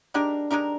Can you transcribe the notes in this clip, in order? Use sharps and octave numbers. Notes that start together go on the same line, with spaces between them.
G#3 D4 D#4 G4 A#4
G#3 D4 D#4 G4 A#4